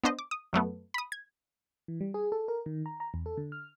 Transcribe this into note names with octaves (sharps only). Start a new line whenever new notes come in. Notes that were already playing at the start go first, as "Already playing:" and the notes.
B3 D4 C5 D#5
D6
D#6
F#2 F#3 A3 B3
B5 D#6
G#6
E3
G3
G#4
A4
A#4
D#3
A#5
A#5
E2
A4
D3
F6